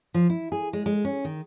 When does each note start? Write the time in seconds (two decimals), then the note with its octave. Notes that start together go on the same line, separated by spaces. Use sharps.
0.14 F3
0.30 E4
0.52 G#4
0.73 G#3
0.86 G#3
1.05 C#4
1.25 D#3